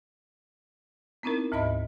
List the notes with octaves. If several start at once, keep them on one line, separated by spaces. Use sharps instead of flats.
B3 C4 D#4 E4 A#4
D2 G#2 D#5 E5 B5